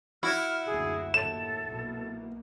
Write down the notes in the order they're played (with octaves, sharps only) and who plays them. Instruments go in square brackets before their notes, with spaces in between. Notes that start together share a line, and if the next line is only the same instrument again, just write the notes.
[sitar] E4 F#4 [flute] F6
[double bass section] F#1 D2 [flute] G#4
[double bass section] D#2 A2 [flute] A4 [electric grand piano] E7
[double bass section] B1 B2 A#3